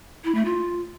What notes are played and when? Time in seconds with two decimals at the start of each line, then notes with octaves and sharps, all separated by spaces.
0.24 E4
0.35 A3
0.45 F4